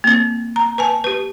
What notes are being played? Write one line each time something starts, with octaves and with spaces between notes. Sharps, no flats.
A#3 C4
A#5
B4 G#5 A5
G4 B4